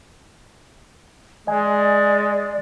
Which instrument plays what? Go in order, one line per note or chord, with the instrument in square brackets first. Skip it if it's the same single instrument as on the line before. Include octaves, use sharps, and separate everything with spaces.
[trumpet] G#3 [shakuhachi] D5 [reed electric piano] D#5 G#5